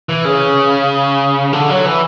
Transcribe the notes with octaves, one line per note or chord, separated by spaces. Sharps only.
E3
C#3
D3
F#3
E3